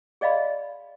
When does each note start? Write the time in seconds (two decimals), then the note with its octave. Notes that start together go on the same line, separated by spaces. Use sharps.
0.21 G#4 D5 D#5 F5 B5 C6